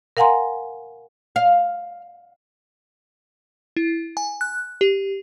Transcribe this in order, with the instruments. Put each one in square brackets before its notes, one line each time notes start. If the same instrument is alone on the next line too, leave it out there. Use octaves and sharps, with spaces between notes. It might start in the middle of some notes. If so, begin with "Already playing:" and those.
[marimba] A#4 F5 F#5 G#5 A#5 C6
[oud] F5
[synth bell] E4
G#5
F#6
G4